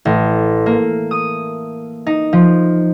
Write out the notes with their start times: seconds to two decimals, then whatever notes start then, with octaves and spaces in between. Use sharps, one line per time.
0.05 A1
0.66 A#3
1.11 D#6
2.07 D#4
2.33 F3